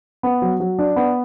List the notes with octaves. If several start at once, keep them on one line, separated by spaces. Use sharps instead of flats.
B3
F#3
F#3
D4
B3